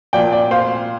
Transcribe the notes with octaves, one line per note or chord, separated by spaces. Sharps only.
A#2 F3 D5 G5
D5 G5
C5 F5